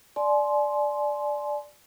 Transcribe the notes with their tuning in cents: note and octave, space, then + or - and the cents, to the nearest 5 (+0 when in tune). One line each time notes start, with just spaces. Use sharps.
D5 +0 G#5 +35 C6 +0